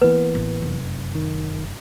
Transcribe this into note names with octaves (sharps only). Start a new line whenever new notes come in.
E3 A#3 B3 B4
A1
F1 F#2
D#3